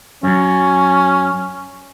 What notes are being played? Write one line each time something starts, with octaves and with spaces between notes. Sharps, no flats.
F#2 F#3 C#4